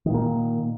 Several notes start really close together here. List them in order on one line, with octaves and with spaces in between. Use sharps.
D#3 A#2 A#3